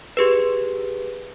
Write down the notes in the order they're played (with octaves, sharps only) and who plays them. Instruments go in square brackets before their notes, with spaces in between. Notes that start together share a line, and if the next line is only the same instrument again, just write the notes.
[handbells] G4 G#4 B4